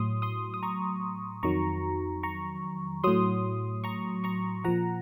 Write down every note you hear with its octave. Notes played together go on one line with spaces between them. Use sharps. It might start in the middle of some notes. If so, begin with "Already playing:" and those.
Already playing: A2 F#3 C6 D#6
C6 D#6
D#6
A#5 C#6
F2 D#3 F#3 A#5 C#6
A#5 C#6
A2 F#3 C6 D#6
A#5 C#6
A#5 C#6
A#2 F3 F#5 A#5